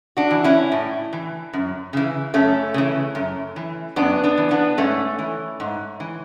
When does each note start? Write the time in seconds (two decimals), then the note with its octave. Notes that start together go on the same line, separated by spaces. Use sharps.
0.17 D4 F#4
0.31 E3
0.44 C#4 E4
0.72 A2
1.13 E3
1.53 F#2
1.93 C#3 E3
2.34 F#2 A3 C#4
2.74 C#3 E3
3.15 F#2
3.56 E3
3.96 F#2 B3 D4
4.24 B3 D4
4.38 E3
4.51 B3 D4
4.77 G#2 A3 C#4
5.19 E3
5.60 G#2
6.00 E3